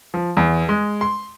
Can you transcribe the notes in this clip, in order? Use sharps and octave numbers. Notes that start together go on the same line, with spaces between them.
F3
E2
G#3
C6